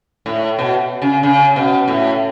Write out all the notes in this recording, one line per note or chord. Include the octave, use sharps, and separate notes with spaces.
A2
B2
C#3
C#3
B2
A2